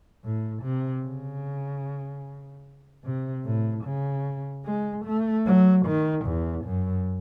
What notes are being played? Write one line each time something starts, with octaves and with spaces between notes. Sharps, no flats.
A2
C3
C#3
C3
A2
C#3
G#3
A3
F#3
D#3
E2
F#2